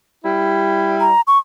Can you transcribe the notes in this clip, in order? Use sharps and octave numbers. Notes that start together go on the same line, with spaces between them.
G3 E4
A#5
C#6